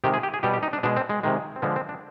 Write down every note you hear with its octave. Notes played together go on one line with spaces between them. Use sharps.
C3 D#3 G#3 G4
G#4
G4
G#4
B2 G3 G4
G4
D#4
D4
B2 G#3 D4
C4
G#3
C3 D#3 G#3
C4
D3 F3 G#3 B3
C4
D4